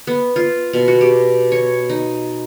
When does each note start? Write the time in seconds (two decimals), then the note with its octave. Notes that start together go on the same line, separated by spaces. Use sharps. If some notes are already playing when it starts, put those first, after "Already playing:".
0.07 B3
0.36 F4
0.73 B2
0.88 F#4
1.01 G4
1.52 C#5
1.89 D#4